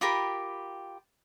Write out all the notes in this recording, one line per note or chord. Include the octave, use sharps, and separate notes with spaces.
F4 G4 A#4 B5